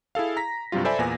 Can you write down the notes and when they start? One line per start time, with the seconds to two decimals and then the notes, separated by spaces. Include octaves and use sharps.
0.15 E4 G#4 A4 F5
0.37 A#5 A#6 B6
0.72 G2 C3 F#3 G3 F4
0.85 A4 C5 D5 E5 G#5 B5
0.99 E2 A#2 B3 G#5 A#6